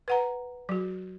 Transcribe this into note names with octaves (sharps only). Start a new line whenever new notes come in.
B4 F#5 A#5
F#3 F#4